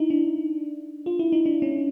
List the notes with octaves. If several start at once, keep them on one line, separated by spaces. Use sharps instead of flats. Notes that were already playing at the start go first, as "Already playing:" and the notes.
Already playing: D#4 E4
D4
F4
E4
D#4
D4
C#4